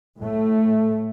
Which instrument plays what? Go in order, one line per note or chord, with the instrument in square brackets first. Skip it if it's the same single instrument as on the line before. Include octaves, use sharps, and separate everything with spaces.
[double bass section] A2 A3